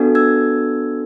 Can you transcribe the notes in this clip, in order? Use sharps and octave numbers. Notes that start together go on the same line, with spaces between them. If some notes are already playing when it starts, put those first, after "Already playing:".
Already playing: B3 D4 F#4 A4
E6 G#6